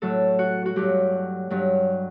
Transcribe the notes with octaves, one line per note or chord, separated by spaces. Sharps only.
A2 F#3 A4
F#4
F#4
G2 F#3 G4
G2 F#3